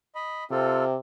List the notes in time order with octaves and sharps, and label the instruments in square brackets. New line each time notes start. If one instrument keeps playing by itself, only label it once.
[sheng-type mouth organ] D#5 B5
[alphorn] C3 [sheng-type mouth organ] C4 F4 A4